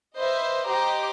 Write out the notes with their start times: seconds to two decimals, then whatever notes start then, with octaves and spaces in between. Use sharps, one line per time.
0.17 B4 C5 D#5 E5
0.68 G4 C5 D#5 A#5 D6